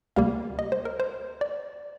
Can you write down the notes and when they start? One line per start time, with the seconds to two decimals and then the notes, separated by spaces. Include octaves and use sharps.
0.16 D2 C3 G3 A#3 F5
0.59 D#5
0.72 C5
0.85 A#4
1.00 C5
1.41 D5